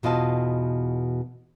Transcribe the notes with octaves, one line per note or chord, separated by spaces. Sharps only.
E2 B2 F4 D#5 A5